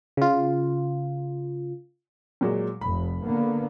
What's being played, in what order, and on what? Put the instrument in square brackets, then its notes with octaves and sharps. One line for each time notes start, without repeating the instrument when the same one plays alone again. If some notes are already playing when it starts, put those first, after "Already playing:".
[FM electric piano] C#3 F4
[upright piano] A#2 F#3 G#3
[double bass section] F1 [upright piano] B5
[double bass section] D3 A#3 B3